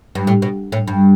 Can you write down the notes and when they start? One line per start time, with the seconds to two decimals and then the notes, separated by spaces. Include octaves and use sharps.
0.15 G2
0.27 A2
0.42 B2
0.72 A2
0.87 G2